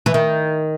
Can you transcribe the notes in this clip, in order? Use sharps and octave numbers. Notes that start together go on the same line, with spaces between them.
E3
D#3